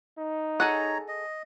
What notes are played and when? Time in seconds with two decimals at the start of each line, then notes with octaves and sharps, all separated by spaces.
0.18 D#4
0.60 G#4 A4 C#5 F#5 A#5
1.08 D#5